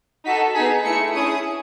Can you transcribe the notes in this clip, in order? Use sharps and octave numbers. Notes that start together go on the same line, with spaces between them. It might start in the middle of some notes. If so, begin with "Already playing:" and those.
D#4 F#4 A4 B6
B3 D#4 G#4 B6
A3 E4 G#4 C#7
C#4 E4 G#4 D#6